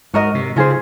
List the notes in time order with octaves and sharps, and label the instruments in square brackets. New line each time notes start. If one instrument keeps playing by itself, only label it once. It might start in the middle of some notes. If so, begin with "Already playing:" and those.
[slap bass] G#2 [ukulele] F#4 A#4 D#5
[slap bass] C3
[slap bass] C#3 [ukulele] F4 G#4 C5